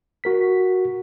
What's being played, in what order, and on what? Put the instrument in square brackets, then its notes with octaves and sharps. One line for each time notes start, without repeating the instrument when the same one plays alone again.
[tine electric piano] F#4 A#4 B6